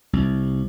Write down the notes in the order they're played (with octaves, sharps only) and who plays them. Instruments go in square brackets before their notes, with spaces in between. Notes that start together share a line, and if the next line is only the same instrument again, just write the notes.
[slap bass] C2